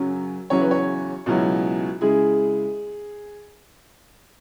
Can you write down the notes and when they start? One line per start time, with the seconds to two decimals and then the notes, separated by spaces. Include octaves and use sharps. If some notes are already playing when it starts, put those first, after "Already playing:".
Already playing: F#2 C#3 F#3 C#4
0.50 E2 C#3 F#3 C#4 E4 C#5
0.60 B4
0.71 C#5
1.26 C#2 B2 F#3 C#4 E4
2.01 C#3 G#3 E4 G#4